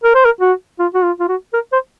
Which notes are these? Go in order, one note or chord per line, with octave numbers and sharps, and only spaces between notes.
A#4
C5
A#4
F#4
F4
F#4
F4
F4
F#4
A#4
C5